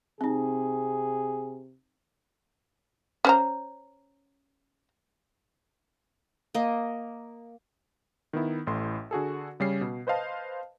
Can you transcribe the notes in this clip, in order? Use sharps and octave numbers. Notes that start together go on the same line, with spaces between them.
C3 C4 D#4 G#4
C#4 C5 A#5
A#3 D#5
D#3 B3 E4
A1 A2 C6
D3 F#4 G#4 A4
C#3 G3 C#4 C7
B2
B4 C5 D#5 F5 A5